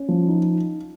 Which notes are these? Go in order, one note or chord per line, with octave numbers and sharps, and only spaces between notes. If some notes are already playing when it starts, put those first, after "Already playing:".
Already playing: C#4
F3
D#4